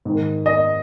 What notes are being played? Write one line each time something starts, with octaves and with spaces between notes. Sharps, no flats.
G#2 D#3
D#5